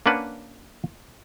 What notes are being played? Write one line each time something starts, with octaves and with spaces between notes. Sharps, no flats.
A#3 C#4 D4 B4 F#5